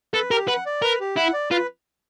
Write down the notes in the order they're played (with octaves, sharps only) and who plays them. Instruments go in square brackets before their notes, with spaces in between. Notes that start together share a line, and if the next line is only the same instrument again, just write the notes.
[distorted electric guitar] A4 [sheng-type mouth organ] B4
[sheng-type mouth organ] G4 [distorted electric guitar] A#4
[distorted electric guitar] B4 [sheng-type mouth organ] F#5
[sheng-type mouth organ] D5
[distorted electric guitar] A#4 [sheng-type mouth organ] B4
[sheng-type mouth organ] G4
[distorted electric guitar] E4 [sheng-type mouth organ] F#5
[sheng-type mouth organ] D5
[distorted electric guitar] F4 [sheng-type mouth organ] B4